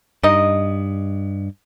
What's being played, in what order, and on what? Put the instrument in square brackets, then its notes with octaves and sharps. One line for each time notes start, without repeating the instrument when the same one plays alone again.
[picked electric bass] G2 [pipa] D#4 D#5